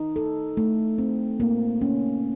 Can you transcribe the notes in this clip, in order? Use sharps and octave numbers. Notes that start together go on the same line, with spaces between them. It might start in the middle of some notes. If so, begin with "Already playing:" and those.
Already playing: D#4
A4
A3
C4
A#3
C#4